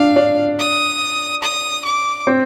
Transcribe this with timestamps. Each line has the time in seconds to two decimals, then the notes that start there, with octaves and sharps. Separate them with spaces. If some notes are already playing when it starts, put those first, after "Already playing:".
Already playing: D4 F5
0.16 D4
0.59 D#6
1.42 D#6
1.85 D6
2.27 C4